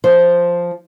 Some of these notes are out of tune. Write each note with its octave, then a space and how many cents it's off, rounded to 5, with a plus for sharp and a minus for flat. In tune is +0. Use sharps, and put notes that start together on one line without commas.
F3 +0 C5 +0